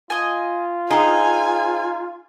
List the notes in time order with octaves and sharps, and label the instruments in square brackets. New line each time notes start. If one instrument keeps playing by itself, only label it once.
[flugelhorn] F4 [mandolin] D#5 G#5
[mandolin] C4 G#4 [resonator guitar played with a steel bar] D#4 [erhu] G#5